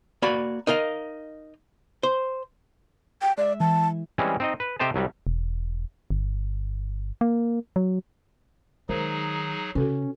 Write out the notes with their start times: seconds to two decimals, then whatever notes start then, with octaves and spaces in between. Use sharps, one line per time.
0.22 A#3 F#4 D5 B5
0.67 D#4 A#4 D#5 F5
2.03 C5
3.22 G5
3.38 G#3 D5 E5
3.60 E3 A5
4.18 E3 G3 G#3 C4 C#4
4.40 C4 D#4 D#5
4.60 B4
4.79 C3 G4 A4 C5 D#5 A5
4.94 C2 F#3 G3
5.27 E1
6.10 G1
7.21 A#3
7.76 F#3
8.89 D#3 F#3 G#3 D#4 G#4 A#4 C5
9.75 C#3 C#4 F#4 A4 B4